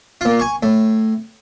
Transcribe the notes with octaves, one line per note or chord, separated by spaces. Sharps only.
A#2 F4
G#5 C#6
A2